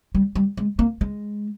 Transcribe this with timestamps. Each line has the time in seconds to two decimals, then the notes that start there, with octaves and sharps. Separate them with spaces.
0.14 G3
0.35 G3
0.57 G#3
0.79 A#3
1.01 G#3